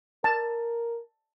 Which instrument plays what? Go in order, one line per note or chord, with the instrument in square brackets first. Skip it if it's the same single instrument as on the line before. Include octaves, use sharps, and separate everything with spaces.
[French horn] A#4 [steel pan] A5